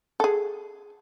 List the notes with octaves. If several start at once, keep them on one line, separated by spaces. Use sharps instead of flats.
G#4 A4